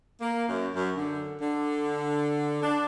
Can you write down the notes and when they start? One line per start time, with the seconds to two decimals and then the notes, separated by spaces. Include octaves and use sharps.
0.21 A#3
0.49 F#2
0.76 F#2
0.97 D3
1.42 D3
2.63 D4